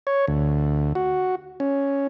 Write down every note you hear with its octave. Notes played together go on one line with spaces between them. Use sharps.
C#5
D2
F#4
C#4